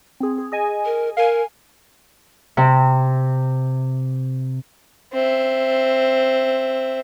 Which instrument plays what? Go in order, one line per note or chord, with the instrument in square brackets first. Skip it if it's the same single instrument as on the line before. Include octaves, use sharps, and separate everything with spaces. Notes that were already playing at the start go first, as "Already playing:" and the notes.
[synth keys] C4 G#4
G#4
G#4 D#5 G#5
[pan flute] A#4
[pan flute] A#4 [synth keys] F5 G#5
[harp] C3 C4
[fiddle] C4 E5